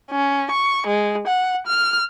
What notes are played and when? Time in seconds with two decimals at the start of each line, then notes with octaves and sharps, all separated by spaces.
0.11 C#4
0.51 C#6
0.87 G#3
1.27 F#5
1.67 F6